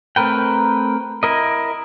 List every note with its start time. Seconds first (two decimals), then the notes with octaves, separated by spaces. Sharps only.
0.16 A3 C4 A#4 B4 G5
1.23 E4 A#4 D#5